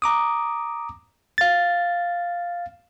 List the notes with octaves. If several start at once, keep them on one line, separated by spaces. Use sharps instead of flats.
A#5 D6 D#6
F5 A6